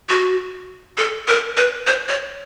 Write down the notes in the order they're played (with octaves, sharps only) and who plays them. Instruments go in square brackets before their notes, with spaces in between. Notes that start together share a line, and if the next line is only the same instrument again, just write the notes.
[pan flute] F#4
A4
A#4
B4
C5
C#5